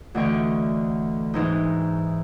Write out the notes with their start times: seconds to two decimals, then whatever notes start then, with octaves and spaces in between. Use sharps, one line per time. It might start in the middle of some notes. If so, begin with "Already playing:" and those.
0.14 D2 D3 E3 D#5 G5 C#6
1.34 G#2 E3 D#4